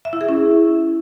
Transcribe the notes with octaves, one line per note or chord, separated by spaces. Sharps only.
E5
E4
G#4
C#4